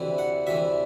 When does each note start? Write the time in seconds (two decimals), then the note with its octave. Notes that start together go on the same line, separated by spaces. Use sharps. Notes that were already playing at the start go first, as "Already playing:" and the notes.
Already playing: D2 C3 E3
0.18 F#5
0.47 D2 C3 E3 E5